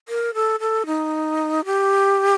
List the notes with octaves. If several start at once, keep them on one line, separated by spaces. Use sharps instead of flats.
A#4
A4
A4
D#4
G4